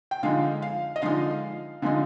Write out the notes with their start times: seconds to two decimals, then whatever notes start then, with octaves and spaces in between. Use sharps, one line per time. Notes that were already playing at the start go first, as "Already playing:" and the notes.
0.11 G5
0.23 D3 F3 G#3 D#4 F5
0.62 F5
0.96 D#5
1.02 D3 F3 G#3 D#4 F5
1.82 D3 F3 G#3 D#4